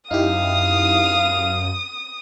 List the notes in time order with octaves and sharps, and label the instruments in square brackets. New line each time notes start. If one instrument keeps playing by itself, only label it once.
[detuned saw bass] F#2 [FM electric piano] D#4 E4 G4 [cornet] F5 [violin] D#6